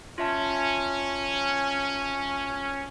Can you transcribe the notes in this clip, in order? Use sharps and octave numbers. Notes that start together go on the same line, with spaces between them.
C#4 F4 E5 A5